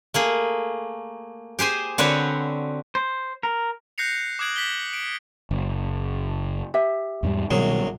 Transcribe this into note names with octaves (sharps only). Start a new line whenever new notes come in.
A3 A#3 G#4
G4 G#4 C5 G#5
D3 C4 F#4 B4 C#5
C5
A#4
F#6 G6 A#6 C7 C#7 F7
D6 D#6 F#6 G#6 D7 F#7
A#6 B6 F#7 G7
D7
F#1
G4 E5
E2 G#2 G3
C2 B2 D#3 F#3 G#4